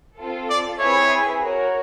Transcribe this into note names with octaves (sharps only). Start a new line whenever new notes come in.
C4 F4 A4
D5
C4 E4 G#4 B4 C#5 E5
F#4 A#4 C#5